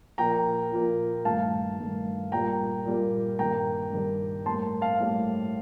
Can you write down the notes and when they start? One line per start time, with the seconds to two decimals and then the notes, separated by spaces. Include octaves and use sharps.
0.18 A#2 F3 A#3 G5 A#5
0.72 A#2 F3 A#3
1.25 G2 D#3 A3 F5 A5
1.79 G2 D#3 A3
2.32 A#2 G3 A#3 G5 A#5
2.85 A#2 G3 A#3
3.39 G2 D#3 G3 A#3 G5 A#5
3.92 G2 D#3 G3 A#3
4.46 A2 G3 A#3 A5 C6
4.81 F5 A5
5.00 A2 G3 A#3